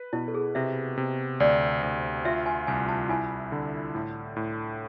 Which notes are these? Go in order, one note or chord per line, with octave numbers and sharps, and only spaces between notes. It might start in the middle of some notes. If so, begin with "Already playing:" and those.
Already playing: B4
B2 E4
A4
G#4
C3 E5
C3
D2 D5
D2
F4 E5
G#5
C2 G#5
A5
E4 G#5
D3
A2
A2